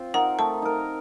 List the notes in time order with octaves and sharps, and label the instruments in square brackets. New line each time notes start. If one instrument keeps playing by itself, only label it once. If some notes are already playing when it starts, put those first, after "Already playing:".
Already playing: [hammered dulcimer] C4 F4
[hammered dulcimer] D#4 A#4 [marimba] F#5
[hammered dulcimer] A3 [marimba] A5
[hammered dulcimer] D#4 A#4